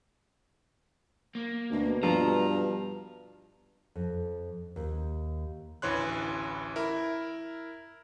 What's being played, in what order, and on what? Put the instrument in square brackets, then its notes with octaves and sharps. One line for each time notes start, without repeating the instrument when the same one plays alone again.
[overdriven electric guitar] A#3
[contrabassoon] D2 [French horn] B2
[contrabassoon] G2 [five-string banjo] F3 [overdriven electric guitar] A#5
[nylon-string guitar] F2
D#2
[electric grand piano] A1 D2 E3 C#5 C6 F#6
E4 A#4